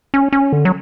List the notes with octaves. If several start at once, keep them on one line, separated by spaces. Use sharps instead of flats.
C#4
C#4
D3
F#3